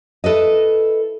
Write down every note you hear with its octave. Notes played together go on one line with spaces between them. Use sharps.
E4 A4 B4 D#5